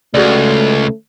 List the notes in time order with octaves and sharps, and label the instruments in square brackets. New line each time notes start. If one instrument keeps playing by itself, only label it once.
[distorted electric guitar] C#2 [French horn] A3 [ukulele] F#4 G#4 D5